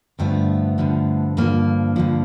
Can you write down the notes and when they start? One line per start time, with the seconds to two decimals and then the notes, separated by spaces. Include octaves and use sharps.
0.19 G2 D3 F3 A3 B3
0.78 G2 D3 F3
1.37 G2 D3 F3 G#3 A#3
1.96 G2 D3 F3